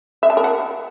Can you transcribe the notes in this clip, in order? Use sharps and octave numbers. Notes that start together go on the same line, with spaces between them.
E5
A5
A#4
F#5